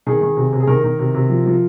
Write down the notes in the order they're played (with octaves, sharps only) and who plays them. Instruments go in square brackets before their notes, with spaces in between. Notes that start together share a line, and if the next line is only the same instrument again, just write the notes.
[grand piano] D#3 G#4
D#3
C3
C3
G#4
D#3 A#4
D#3
C3
C3
F3
F3